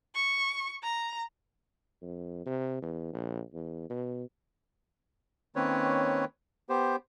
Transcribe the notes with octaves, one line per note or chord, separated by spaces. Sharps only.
C#6
A#5
F2
C3
E2
A#1
E2
B2
D#3 A#3 C4 C#4 B4 C#5
B3 G4 C5